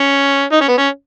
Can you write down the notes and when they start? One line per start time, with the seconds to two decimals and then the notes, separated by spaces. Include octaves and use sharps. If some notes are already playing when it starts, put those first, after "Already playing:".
Already playing: C#4
0.52 D#4
0.61 C#4
0.69 B3
0.78 C#4